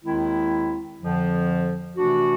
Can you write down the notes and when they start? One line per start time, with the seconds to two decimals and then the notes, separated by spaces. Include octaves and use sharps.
0.04 D#2 D#3 G#3 C4 E4
1.00 F2 D3 F3
1.97 C3 E3 A3 D4 F#4